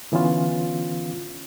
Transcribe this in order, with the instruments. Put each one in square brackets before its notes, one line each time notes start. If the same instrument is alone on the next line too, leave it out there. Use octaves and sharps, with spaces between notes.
[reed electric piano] D3 E3 B3 C#4 F4